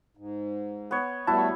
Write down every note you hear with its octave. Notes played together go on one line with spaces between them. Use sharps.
G#2
B3 C#5
G3 A3 B3 E4 F#4 A5